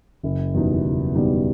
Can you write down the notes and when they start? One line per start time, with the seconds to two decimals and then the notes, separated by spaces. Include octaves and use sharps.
0.23 F#1
0.54 E2 B2 G3 D#4
0.85 F#1
1.15 E2 B2 G3 D#4